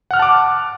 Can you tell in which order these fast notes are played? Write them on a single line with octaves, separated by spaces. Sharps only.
F#5 F6 F#6 A5 D6